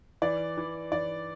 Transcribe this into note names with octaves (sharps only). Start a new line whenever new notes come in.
E3 D5
E3
E3 D5